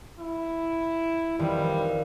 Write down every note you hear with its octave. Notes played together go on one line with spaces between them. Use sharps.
E4
F2 D#3 E3 G3